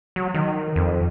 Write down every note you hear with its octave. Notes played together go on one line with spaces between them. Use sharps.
F#3
D#3
F2